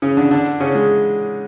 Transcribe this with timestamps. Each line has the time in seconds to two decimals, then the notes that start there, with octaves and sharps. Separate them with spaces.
0.02 C#3 C#4
0.17 D3 D4
0.31 D3 D4
0.60 C#3 C#4
0.75 G#3